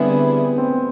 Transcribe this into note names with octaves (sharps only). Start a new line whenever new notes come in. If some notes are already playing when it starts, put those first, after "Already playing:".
Already playing: D3 G3 B3 C4 E4 G#4
C4